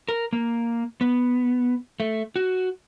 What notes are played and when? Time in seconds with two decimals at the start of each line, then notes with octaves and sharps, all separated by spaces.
0.09 A#4
0.33 A#3
1.01 B3
2.00 A3
2.36 F#4